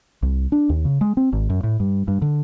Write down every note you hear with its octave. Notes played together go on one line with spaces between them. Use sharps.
C2
D4
D#2
C#3
G#3
C4
G#1
F#2
A2
G2
G2
D3